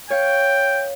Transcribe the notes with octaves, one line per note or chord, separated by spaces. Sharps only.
C#5 F5 G5